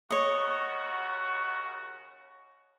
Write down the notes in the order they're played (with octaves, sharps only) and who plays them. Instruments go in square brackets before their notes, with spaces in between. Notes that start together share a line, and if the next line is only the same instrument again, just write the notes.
[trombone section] D#2 C#3 F#4 [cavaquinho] C#5 D#5